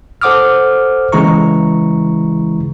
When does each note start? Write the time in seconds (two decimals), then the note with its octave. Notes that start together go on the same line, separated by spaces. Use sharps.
0.22 A4 C5 F#5 D6 D#6 F6
1.12 C#3 E3 G#3 E4 A#5 C#6